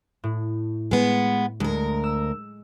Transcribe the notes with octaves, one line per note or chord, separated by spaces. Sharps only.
A2
G#3 B3
D2 G#3 A#4
E6